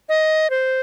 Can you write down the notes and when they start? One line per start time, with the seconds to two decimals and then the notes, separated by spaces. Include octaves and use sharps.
0.09 D#5
0.50 C5